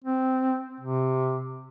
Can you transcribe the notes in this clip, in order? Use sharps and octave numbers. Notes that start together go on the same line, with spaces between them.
C4
C3